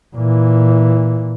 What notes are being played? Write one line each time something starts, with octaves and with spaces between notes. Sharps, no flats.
A#2 E3